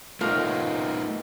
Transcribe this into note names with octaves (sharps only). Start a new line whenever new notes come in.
A2 A3 B3 D#4 F4 A#4